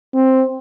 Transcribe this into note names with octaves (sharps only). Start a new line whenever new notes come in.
C4